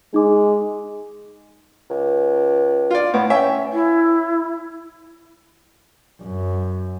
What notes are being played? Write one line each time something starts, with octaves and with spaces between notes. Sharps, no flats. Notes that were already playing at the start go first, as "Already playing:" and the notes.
G#3 D#4 D6
C#2
F4 D5
A2 B3
C#4 E5 G5
E4
F#2